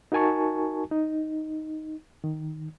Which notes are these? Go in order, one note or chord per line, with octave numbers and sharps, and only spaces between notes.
D#4 F#4 A#4 G#5 A5 C#6
D#4
D#3